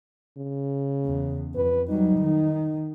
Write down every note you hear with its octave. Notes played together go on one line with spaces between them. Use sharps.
C#3
E2
F2 B4
F#3 G3 D#4
D#3